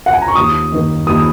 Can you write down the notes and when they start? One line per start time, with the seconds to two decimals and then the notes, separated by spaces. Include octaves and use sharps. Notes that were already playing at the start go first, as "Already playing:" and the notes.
0.06 F#5
0.13 G#5
0.22 A#5
0.28 C#6
0.36 D#2 D#6
0.72 D#3 A#3
1.07 D#2 D#6